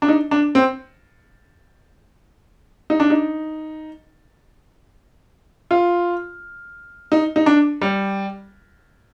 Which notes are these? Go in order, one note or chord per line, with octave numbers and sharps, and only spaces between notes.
D4
D#4
D4
C4
D#4
D4
D#4
F4
D#4
D#4
D4
G3